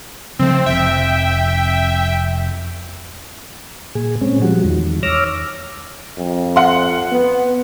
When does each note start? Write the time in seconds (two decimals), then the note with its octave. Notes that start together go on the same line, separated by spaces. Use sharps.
0.39 C#3 F3 A3 C4
0.66 F1 F2 E5 G5
3.95 A#2 G#4
4.21 A#2 G#3 C4 C#4
4.42 F3 G3 G#3 F#4
4.64 E2 D#3
5.03 C#5 D6 E6 F6 A#6
6.18 F2
6.56 F#5 C6
7.12 B3